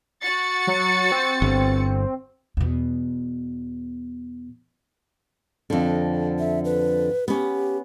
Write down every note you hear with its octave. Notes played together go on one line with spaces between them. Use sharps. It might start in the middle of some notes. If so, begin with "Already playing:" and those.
F#4 A6 C#7
F#3
C4
G1
E2 B2
F2 D3
E5
B4
B3 C#4 G4